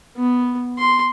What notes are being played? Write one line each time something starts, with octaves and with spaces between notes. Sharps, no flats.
B3
C6